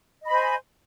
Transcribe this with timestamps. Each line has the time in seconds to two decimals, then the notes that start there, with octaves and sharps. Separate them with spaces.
0.22 D#5
0.26 B5
0.30 C5
0.34 G#5